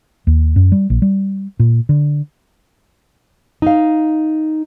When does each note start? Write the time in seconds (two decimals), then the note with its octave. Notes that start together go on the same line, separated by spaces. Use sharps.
0.27 D#2
0.56 F#2
0.72 G3
0.90 A#1
1.02 G3
1.59 A#2
1.89 D3
3.62 D#4 F5